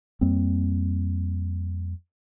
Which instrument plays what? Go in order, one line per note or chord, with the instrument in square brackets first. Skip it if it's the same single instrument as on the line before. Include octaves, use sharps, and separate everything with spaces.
[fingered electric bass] F2 G3 A#3 C4